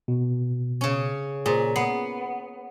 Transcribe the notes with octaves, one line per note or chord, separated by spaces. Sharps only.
B2
C#3 C#4
A#2 G#4 C5
B3 C7